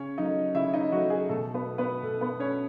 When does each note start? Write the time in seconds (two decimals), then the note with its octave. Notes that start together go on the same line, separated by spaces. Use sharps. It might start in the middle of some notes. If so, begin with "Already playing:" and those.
Already playing: C#3 C#4 C#5
0.18 F#3 A3 D#4 D#5
0.55 C#3 E4 E5
0.73 D#4 D#5
0.92 F#3 F#4
0.96 A3
1.10 G#4
1.29 B2 A3 A4
1.54 B3 B4
1.66 A3
1.78 B3 B4
2.03 B2 A3 A4
2.21 B3 B4
2.40 A3 C#4 C#5